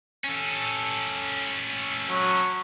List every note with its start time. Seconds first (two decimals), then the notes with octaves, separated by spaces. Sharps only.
0.24 C#4 A4
2.10 F#3